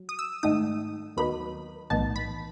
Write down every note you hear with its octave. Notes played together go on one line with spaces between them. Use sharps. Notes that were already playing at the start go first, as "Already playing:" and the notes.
Already playing: F#3
D#6
E6
G#2 D#3 A3 D#4 D#6
D#2 D#3 F#3 B3 D#4 B5
B1 A2 E3 B3 D#4 A5
B5